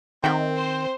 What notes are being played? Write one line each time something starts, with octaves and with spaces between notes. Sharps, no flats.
D#3 C4 E5 F#5 G5
C5